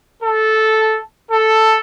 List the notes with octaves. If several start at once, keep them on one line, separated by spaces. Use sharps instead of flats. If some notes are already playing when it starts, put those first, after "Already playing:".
A4
A4